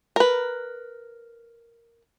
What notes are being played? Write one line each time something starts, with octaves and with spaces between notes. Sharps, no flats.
A#4 B4